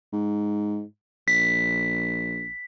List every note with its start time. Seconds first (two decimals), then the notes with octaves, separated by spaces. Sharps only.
0.13 G#2
1.28 A#1 B6